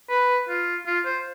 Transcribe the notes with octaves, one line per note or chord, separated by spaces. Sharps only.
B4
F4
F4
C5